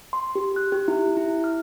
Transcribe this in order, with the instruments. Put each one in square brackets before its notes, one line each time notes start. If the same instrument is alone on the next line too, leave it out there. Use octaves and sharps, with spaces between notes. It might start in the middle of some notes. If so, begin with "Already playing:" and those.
[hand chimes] C6
G4
F#6
G4
E4
E4
F6